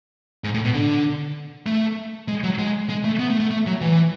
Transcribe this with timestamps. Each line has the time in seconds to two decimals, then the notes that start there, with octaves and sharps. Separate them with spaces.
0.44 G#2
0.54 A2
0.64 B2
0.74 D3
1.66 A3
2.28 G#3
2.44 F#3
2.59 G#3
2.90 G#3
3.04 A3
3.20 B3
3.30 A3
3.40 A3
3.51 A3
3.67 F#3
3.81 E3